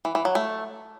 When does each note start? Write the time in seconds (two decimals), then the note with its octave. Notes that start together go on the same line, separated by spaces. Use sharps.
0.05 E3
0.15 E3
0.25 F#3
0.35 A3